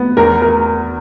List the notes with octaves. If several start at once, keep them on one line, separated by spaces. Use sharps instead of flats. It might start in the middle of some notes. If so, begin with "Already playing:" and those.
Already playing: B3
E2 A#4
A#4